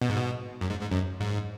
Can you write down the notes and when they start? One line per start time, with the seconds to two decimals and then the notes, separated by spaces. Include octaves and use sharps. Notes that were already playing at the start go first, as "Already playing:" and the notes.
0.01 B2
0.10 G#2
0.17 B2
0.61 F#2
0.70 G#2
0.81 G#2
0.91 F#2
1.20 G#2